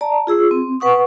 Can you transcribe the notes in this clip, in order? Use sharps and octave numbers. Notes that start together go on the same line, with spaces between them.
D5 A5 A#5
F4 G#4 E6
C4
B4 F#5 C#6 D#6